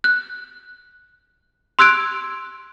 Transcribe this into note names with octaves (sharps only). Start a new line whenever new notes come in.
F#6
C6 E6 F#6 G#6 D7